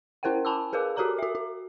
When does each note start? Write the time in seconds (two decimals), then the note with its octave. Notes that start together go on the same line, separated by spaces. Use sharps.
0.23 C#4 E4 A#4 C5 F#5 G5
0.45 G#5 A5 B5 D6 E6
0.73 G#4 A#4 B4 F5 D6
0.96 F#4 G4 A4 A#4 A#5 D6
1.19 F#4 E5
1.35 F#4